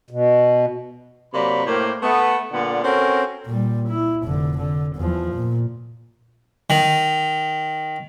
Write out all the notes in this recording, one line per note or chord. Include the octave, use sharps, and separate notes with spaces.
B2
C3 F#3 A#3 D5 B5
A2 A#3 G4 A#4 C5
A3 B3
A#2 D3 G3 B3 F#5
C4 C#4 F#4 A4 A#4
A#2 G3
E4
F1 D3
D3
E2 F3
A#2
D#3